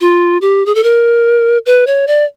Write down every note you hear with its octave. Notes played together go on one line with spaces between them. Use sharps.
F4
G4
G#4
A4
A#4
B4
C#5
D5